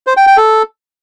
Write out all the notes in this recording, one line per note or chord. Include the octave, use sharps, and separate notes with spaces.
C5
G5
G5
A4